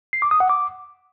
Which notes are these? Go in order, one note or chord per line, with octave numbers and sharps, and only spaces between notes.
C7
D6
D#6
F#5
D6